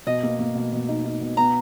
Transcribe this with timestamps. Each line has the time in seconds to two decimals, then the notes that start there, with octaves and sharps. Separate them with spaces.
0.06 B2 D#5
0.23 A#3
0.39 A#3
0.55 B2
0.72 B2
0.88 D#4
1.05 D#4
1.21 B2
1.37 B3 A#5